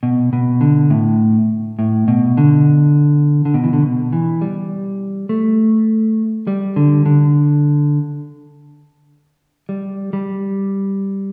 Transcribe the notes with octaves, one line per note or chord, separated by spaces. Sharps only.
B2
B2
D3
A2
A2
B2
D3
D3
B2
E3
D3
B2
E3
G3
A3
G3
D3
D3
G3
G3